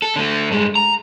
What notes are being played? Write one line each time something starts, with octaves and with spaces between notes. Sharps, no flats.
A4
D3 A3
G2 G#3
A#5